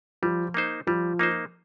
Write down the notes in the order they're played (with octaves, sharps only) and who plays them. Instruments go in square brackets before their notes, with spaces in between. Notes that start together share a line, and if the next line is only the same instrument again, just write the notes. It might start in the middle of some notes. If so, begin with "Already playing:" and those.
[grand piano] F3 [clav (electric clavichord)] G3
[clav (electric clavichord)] A#3 D#4 C5
[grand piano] F3 [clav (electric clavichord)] G3
[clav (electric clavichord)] A#3 D#4 C5